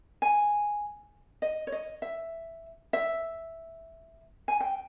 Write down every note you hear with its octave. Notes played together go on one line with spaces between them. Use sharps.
G#5
D#5
C#5
D#5
E5
E5
G#5
G5